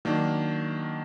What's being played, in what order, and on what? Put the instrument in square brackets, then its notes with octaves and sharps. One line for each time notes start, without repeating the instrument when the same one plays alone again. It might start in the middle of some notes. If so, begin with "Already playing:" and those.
[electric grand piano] D#3 F#3 A#3 D4